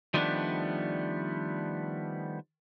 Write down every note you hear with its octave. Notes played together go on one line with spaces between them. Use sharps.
D#3 F3 G3 A3 B3 D4